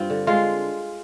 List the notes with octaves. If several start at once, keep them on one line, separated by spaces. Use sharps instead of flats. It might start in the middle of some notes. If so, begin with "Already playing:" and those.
Already playing: G2 C4 D4 F4
D3
G#3 F4